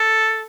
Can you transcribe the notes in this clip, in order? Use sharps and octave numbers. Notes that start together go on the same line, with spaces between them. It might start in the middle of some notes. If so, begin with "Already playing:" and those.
Already playing: A4